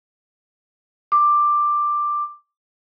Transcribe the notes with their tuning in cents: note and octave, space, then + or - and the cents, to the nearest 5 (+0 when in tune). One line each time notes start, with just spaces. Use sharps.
D6 +10